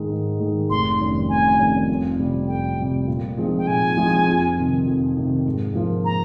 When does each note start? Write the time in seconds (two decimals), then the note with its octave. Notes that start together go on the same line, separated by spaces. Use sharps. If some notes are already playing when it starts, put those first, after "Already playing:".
Already playing: G#2 D#3 G#3 D#4
0.10 G#2
0.40 D#3 G#3 D#4
0.69 F1 C6
0.99 F2 D#3 G3 C#4
1.29 F1 G#5
1.59 F2 D#3 G3 C#4
1.89 F2
2.19 C3 G3
2.48 F2 G5
2.78 C3 G3
3.07 A#2
3.37 F3 G#3 C4 D#4
3.58 G5
3.67 A#2 G#5
3.97 F3 G#3 C4 D#4
4.26 F2
4.57 C3 D#3
4.86 F2
5.16 C3 D#3
5.46 G#2
5.75 F3 A#3 F4
6.05 A#5